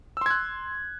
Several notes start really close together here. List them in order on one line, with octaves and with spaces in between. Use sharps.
E6 C6 G#6 F#6